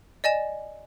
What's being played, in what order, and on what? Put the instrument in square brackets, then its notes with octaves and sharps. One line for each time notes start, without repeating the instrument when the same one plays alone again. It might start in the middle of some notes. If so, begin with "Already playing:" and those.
[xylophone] D5 D#5 G#5 E7